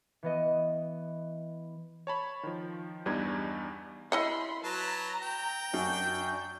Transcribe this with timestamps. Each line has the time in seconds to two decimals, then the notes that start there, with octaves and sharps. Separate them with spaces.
0.23 E3 B3 D#5
2.07 C#5 A5 B5
2.43 D#3 F3
3.06 E2 G2 G3 D4 D#4 G#6
4.12 E4 D#5 F#5 B5 C6
4.64 F#3 B4 A5 A#5
5.22 G5
5.74 F#2 D4 F#4 G6